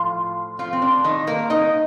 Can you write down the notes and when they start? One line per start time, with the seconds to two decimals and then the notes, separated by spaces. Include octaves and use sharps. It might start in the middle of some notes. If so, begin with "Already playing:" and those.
Already playing: A2 F3 F4
0.59 F3 F4
0.73 C4
0.82 D4
1.04 D#3 D#4
1.27 A#3 A#4
1.50 D#4 D#5